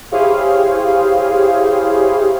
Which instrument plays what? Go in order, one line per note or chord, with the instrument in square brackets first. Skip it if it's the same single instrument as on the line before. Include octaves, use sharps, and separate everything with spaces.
[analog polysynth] E4 G4 G#4 C5 C#5 F5